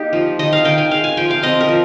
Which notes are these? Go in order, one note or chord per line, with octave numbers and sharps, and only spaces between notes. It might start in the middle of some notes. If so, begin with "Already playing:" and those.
Already playing: A#3 D#4 G4
F3
D#3 D#5
F5
D#3 G5
G#5
G#3 F5
G#5
F3 G5
F5
C4 D#5
A#4
F3